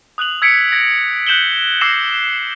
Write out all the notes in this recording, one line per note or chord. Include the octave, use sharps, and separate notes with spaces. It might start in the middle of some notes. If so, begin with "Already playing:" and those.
D#6 F#6 F7 F#7
E6 G#6 B6 C#7 D7
G#6 A#6
F#6 G6 E7 F#7 G7
D6 E6 A#6 C7 E7